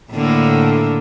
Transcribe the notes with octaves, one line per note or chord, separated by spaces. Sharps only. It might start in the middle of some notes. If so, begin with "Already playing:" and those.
A2 D3 A#3